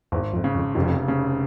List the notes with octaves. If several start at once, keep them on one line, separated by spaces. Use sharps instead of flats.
G#1 E2
F2
C#3
F2
F1 F2
C#3